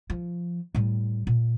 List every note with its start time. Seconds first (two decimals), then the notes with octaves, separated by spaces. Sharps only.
0.10 F3
0.75 A2 G3
1.27 A#2